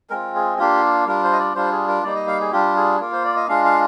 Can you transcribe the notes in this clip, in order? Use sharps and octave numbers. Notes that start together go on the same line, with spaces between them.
G#3 C4 F4 A#4
G#4
A#3 D4 F4 G4
G3 D4 F4 A#4
C5
D#5
D5
G3 D4 F4 C5
G#4
A#4
G3 A#3 D#4 D5
D#5
F5
G#4
G3 D4 F4 G4
G#4
A#3 F4 A#4
C5
D5
D#5
G#3 D4 F4 F5
F5